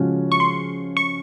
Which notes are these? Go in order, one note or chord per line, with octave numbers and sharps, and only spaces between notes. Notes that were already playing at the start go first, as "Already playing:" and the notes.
Already playing: C#3 F3 G#3 C#4 F#4
C#6
C6
C#6